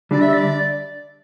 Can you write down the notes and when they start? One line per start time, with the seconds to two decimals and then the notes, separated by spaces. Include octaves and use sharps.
0.11 D3 G3 D5
0.22 E5
0.33 D5